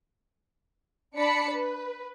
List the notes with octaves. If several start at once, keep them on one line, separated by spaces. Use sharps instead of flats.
D4 D5 A5 B5 C#7
B4